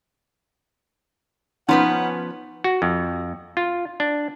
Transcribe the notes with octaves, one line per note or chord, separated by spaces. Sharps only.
F3 B3 C#4 D#4 B4 F#5
F#4
F2
F4
D4